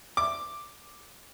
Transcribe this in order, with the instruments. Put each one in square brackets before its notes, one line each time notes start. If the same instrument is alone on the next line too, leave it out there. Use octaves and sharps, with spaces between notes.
[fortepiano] D6